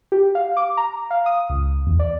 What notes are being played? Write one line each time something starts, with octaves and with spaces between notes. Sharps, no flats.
G4
F5
D6
A#5
F5
D#6
C#2
E2
D5